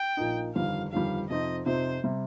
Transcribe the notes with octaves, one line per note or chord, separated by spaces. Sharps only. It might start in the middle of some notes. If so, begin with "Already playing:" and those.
Already playing: G5
A#1 A#2 A#3 D#4
G1 F2 D#3 G3 F5
G1 F2 D#3 G3 F5
F2 C3 F3 C4 D#4 D#5
F2 C3 F3 C4 D#4 C5
C3 G3